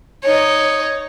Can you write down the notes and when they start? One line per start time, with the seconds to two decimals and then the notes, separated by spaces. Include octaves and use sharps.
0.23 D#4 C#5